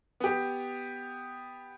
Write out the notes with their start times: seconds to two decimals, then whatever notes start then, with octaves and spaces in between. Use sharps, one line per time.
0.20 B3 G4